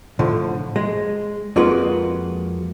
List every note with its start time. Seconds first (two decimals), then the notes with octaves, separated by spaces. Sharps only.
0.19 A2 D3 F3
0.76 G#3
1.56 F2 G#3 A#3 F4 F#4 B4